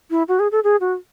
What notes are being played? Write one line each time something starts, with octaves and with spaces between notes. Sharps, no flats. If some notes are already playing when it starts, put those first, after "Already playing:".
E4
F#4
G#4
A4
G#4
F#4